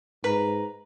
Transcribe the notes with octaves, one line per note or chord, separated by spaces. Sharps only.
G#2 B4 A#5